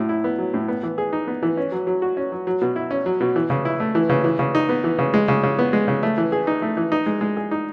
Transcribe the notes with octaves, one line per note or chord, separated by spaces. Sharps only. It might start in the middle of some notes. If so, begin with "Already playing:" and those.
Already playing: A2 F#3
E4
B3
F#3
A2
B3
E3
G#4
D#4
B3
E3
C#4
F#3
F#3
F#4
C#4
F#3
F#3
B2
E4
C#4
F#3
B2
E3
C#3
E4
A3
E3
C#3
E3
C#3
D#4
B3
E3
C#3
G#3
C#3
C#3
B3
G#3
C#3
A3
E3
G#4
D#4
A3
E3
D#4
G#3
G#3
G#4
D#4